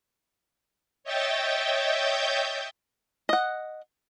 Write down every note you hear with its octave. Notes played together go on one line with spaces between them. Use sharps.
C#5 D#5 E5 G5 G6 A6
D#5 F#5